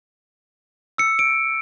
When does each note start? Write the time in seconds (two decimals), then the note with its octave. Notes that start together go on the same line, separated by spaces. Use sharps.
0.98 E6 C#7
1.19 D7